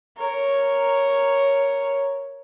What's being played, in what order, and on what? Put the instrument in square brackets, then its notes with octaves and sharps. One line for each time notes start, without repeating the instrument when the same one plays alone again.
[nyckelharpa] A#4 C#5